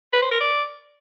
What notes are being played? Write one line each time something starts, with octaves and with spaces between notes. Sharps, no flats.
B4
C5
A#4
D5